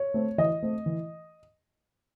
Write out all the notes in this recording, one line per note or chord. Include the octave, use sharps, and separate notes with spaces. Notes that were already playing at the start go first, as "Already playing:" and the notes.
Already playing: C#5
A3 C4
E3 D#5
A3 C4
E3